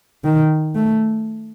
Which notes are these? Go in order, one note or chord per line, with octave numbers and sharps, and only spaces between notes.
D#3
A3